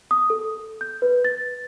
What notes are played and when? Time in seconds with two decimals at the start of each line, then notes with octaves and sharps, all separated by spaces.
0.11 D#6
0.30 A4
0.81 G6
1.02 B4
1.25 A6